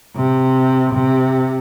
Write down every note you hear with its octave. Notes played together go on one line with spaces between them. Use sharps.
C3
C3